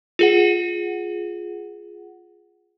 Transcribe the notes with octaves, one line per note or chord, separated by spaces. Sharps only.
F4 G#4 F#5